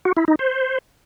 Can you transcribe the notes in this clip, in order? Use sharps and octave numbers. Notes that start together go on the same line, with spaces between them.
F#4
E4
D#4
C5